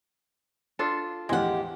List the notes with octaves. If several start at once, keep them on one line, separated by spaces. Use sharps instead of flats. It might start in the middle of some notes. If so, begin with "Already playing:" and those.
D4 F4 A4
E2 A2 F3 G#3 G4 F#5